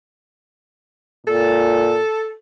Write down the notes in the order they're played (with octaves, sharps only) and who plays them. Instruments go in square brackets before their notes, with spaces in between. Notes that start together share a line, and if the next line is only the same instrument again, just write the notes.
[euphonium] A#2 [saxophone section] A4